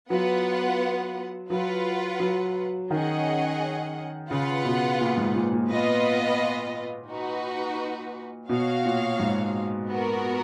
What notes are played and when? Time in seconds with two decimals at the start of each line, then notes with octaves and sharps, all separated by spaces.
0.10 F#3 B3 F4 B4 F#5
1.50 F#3 F4 B4 F#5
2.20 F#3
2.90 D#3 C#4 G#4 D#5 F#5
4.30 C#3 F4 B4 F#5
4.65 B2
5.01 A#2
5.17 G#2
5.36 A#2
5.52 A#2
5.70 A#2 B3 F4 B4 D#5
7.10 D#4 F#4 B4
8.49 B2 F#4 C#5 F5
8.85 A#2
9.19 G#2
9.90 B3 F#4 A#4